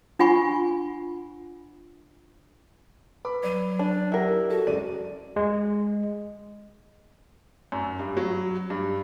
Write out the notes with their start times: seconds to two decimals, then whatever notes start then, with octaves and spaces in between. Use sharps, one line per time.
0.19 D4 F4 F#5 G#5 B5 C#6
3.25 B4 B5 D6
3.43 F#3 D5 D#7
3.79 D4
4.12 E4 G4 A#4 F#5
4.50 F#4 A4
4.67 F#2 G#3 D5 D#7
5.36 G#3
7.72 F#2
7.99 G2
8.17 F#3
8.70 G2